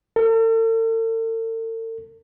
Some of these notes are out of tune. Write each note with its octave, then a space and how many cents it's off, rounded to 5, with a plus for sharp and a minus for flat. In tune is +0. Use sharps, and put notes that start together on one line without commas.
A4 +45